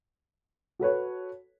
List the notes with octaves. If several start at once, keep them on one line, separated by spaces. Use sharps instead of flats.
F#4 A4 B4 C#5